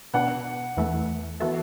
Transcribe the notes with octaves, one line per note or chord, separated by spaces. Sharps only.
B2 B3 D4 F#5
E2 E3 A3
E3 B3 F#4 A4 E5